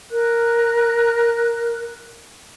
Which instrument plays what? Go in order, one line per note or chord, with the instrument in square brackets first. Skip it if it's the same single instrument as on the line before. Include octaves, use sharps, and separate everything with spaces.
[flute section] A#4 F#6